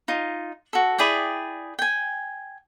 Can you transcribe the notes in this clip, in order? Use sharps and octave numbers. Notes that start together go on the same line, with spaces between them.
D#4 F4
F#4 A4
E4 G#4 D5 G5
G5 G#5